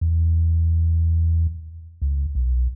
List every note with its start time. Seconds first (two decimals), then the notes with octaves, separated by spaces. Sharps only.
0.01 E2
2.02 C#2
2.35 B1